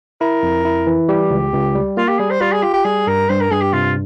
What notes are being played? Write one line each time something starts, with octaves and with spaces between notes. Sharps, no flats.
E4 A#4
F2
E4
E3
G3 G4
C#2
C#2
G3
A#3 F4
G4
G3 G#4
C5
G3 F4
G#4
F4 G4
G4
G3 G#4
G2 A#4
G2 C5
A#4
G2 G#4
G4
C3 F4